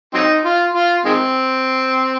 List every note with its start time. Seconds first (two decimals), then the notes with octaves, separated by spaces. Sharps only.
0.14 F#3 C4 D#4
0.45 F4
0.74 F4
1.05 D#3 G#3 C4